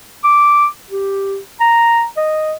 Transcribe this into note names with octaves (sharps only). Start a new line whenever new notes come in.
D6
G4
A#5
D#5